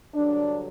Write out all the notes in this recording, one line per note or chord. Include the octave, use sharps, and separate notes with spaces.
G2 D3 F#3 D4